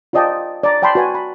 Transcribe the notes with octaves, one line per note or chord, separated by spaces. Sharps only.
F4 C5 D5 D#5 G5 A5
D5 A#5
D5 G5 A5 B5 C6
F#4 B4 G#5
B5